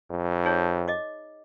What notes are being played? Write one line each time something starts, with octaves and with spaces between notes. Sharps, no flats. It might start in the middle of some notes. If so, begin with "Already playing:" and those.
F2
D#4 G#4 C#5
D#5 D6